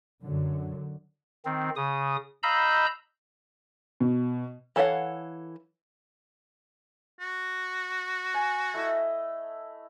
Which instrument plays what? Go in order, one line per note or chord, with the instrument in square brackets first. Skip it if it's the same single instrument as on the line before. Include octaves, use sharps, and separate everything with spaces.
[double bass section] F#2 D3 F#3
[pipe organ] D#3 C4
C#3 D#6
D#5 F5 A#5 B5 E6 G6
[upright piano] B2
[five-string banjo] E3 A4 C#5 F5 F#5
[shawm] F#4
[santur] G#5
A3 E4 D#5